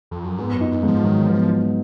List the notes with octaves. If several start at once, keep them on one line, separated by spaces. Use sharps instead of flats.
F2
F#2
G#2 B3
F#2
D#4
F#2
G#2 F3
D#3 F#3
F3 B3
D#4